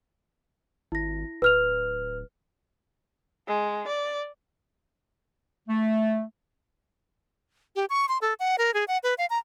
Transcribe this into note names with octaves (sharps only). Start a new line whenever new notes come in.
G#1 E4 A#6
D1 B4 F6 F7
G#3
D5
A3
G4
C#6
C6
A4
F#5
A#4
G#4
F#5
B4
F5
A#5